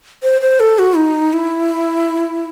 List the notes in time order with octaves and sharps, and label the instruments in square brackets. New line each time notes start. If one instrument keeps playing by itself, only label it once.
[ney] C5
C5
A4
F#4
D#4
E4